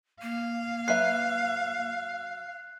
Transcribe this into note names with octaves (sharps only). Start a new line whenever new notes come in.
A#3 F5
F#3 B4 E5 F#6 C7